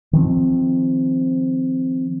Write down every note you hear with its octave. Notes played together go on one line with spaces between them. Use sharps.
D#3 F3 C4